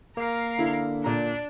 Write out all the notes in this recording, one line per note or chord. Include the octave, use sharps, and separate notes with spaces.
A#3 A#4 F5
D3 E4
A#2 D4 A#5